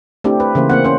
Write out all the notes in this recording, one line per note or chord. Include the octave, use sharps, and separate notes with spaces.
A3 C4 D4 E4 G4
B4
C#3 E3 A#3 C5
A#3 C4 F#5
C#4 C5